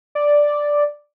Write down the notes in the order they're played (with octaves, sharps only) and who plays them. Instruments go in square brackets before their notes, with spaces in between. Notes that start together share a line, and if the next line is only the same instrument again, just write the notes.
[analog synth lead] D5